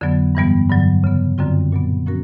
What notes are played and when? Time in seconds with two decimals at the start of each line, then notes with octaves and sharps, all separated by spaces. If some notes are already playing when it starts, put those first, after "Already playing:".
0.01 F2 D3 F#3 B3
0.35 G2 E3 G3 B3
0.70 G2 D3 F#3
1.04 C#3 F#3 B3
1.38 F#2 D3 G3 C4 F4
1.72 A#2 F#3 B3
2.06 F3 A#3 C#4 F#4 A#4